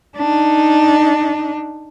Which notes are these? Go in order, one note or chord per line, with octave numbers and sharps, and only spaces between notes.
D4 D#4